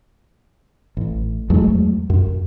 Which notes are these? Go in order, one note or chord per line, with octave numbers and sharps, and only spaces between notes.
A1
E2 F#3 G#3 A3
F#2